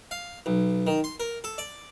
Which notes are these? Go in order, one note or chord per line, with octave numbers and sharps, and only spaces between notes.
F5
B1
D#3
C6
A#4
A4
D5